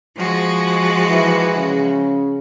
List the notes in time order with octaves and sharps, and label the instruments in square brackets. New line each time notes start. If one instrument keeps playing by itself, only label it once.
[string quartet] F3 G#3 F#4
[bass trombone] E3
C#3